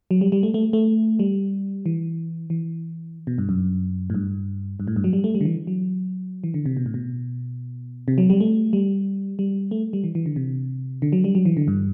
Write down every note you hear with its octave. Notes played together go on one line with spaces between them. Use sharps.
F#3
G3
G3
A3
A3
A3
G3
E3
E3
B2
G2
F#2
A2
G2
G2
A2
G2
F#3
G3
A3
G3
D3
E3
F#3
E3
D3
C3
B2
A2
B2
C3
F#3
G3
A3
G3
G3
A3
G3
E3
E3
D3
C3
D3
F#3
G3
F#3
E3
D3
G2